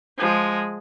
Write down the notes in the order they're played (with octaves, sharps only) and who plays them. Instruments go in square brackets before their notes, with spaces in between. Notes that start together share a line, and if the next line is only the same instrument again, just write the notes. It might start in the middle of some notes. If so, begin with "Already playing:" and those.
[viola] F3 G#3